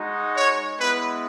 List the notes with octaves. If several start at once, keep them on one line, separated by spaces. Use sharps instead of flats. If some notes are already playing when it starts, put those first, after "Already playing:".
Already playing: G#3 D#4 F#4
C#5
G#3 B3 E4 B4